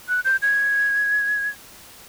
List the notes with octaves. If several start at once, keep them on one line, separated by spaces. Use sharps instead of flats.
F#6
G6
G#6